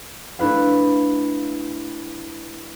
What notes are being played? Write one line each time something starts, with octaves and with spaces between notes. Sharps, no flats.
A3 D4 E4 B4 F5